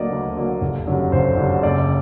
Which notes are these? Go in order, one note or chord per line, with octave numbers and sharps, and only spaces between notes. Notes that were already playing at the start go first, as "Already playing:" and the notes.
Already playing: D2 D3 F#3 A#3 D5 D#5
D2
D3 F#3 A#3
G1
F#2 D3 G3
G1 C5
F#2 D3 G3
F#1 D5